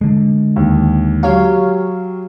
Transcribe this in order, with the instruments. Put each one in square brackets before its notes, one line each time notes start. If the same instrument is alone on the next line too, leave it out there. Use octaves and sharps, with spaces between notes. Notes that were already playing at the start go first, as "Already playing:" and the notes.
[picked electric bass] D3 G#3
[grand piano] D#2
[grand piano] F#3 [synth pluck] G4 C#5 F5